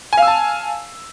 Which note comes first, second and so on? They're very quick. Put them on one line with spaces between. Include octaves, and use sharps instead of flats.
G#5 F5 E6 A5